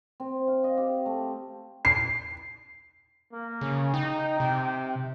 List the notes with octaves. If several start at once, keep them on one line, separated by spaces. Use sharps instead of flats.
C4
F5
D#5
G4
A3
C7
A#3
C#3
D#4 G5
C3